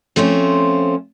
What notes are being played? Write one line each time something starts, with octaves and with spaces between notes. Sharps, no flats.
F3 A3 C4 C#4 F4